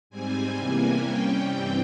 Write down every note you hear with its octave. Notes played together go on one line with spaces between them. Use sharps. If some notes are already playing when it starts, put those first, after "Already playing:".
G#2 G3 C4 G#5
E2 C3 E3 G3 A#3
C3 G3 C#4 G5
G2 E3 G3 C4 G5